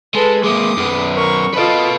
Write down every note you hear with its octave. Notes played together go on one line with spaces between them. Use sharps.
G#3 A4 B4
G#3 A#3 D6 D#6
F#2 B3
A#4 C#6
F4 A4 B4 D#5